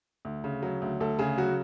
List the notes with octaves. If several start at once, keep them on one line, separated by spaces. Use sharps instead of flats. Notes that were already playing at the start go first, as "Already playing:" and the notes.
D2
C#3
F#3
D2
D2 A4
C#3 G#4
F#3 F#4